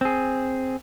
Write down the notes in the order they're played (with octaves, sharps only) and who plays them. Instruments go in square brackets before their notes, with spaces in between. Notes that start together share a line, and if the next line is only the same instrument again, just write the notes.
[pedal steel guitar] C4 G#4